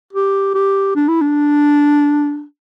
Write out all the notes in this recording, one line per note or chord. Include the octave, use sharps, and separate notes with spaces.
G4
G4
D4
E4
D4